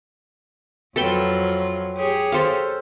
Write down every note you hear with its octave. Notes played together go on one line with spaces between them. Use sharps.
F2 F#3 F4 A4 B4 G5
G4 G#4 C#5
A4 C5 F5